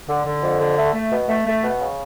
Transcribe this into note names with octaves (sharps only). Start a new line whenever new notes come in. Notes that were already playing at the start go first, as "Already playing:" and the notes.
D3
D3
F2
D3
A3
A3
B2
A3
A3
B2
C#3